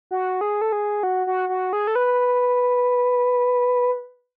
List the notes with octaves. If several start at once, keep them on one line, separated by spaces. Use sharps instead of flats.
F#4
G#4
A4
G#4
F#4
F#4
F#4
G#4
A4
B4